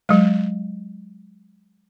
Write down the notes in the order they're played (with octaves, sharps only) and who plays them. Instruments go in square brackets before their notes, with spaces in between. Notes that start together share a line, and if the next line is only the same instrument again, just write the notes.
[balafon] F#3 G#3